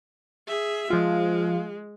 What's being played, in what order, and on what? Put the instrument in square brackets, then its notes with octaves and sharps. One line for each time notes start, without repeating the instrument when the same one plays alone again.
[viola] G#4 E5
[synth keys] F3 F4 [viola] G#3